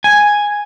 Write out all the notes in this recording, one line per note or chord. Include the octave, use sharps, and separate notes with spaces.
G#5